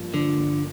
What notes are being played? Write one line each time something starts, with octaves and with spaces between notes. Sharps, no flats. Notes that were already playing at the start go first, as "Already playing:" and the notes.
Already playing: G2 F3 A#3
D3 F3
G1